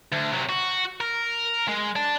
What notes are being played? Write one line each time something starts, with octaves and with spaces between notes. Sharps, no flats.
D2
C3 F#3
F#4
A#4
G#3
D5 A5